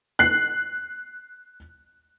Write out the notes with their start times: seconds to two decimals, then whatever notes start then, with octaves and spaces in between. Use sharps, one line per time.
0.19 F#6 C7